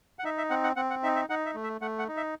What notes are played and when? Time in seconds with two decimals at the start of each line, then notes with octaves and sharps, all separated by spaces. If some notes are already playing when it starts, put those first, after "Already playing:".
0.19 F#5
0.24 D#4 E5
0.38 E5
0.50 C4 F#5
0.64 F#5
0.76 C4 F#5
0.90 F#5
1.03 D#4 E5
1.16 E5
1.30 D#4 F#5
1.46 E5
1.55 A3
1.63 E5
1.81 A3 F#5
1.99 F#5
2.08 D#4
2.17 E5